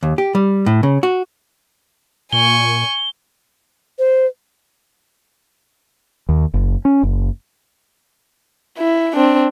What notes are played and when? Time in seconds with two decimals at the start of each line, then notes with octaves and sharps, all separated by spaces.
0.03 D#2
0.18 G4
0.35 G3
0.66 A2
0.83 C#3
1.03 F#4
2.33 A#2 G#5 C#6 G7
3.99 C5
6.29 D#2
6.54 F#1
6.85 C#4
7.03 F#1
8.78 E4
9.16 C4 D4